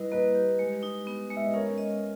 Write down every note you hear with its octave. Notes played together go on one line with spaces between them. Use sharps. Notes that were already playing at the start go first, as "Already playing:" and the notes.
Already playing: G3 E4 B4 D#5
A#3 B4 D#5
G4
G#3
D#4
B3
G#3
E5
D#5
C#4 A#4 C#5
D#5